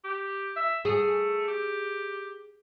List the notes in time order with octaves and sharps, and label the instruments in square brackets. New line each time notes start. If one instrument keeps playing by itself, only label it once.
[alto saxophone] G4
E5
[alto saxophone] A3 [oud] G#4
[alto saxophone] G4